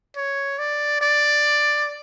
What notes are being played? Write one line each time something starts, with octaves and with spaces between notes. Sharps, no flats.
C#5
D5
D5